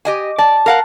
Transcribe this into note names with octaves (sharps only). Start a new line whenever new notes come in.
G4 D#5 G#5
D5 A5
A#4 F5 F#5